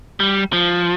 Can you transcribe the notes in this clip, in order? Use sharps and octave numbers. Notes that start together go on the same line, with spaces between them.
G3
F3